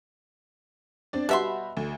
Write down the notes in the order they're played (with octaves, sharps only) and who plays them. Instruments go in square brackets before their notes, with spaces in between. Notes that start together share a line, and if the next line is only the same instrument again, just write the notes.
[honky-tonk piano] C4 D4 D5
[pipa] B2 E5 C6 [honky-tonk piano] G3 F#4 B5
[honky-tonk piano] D2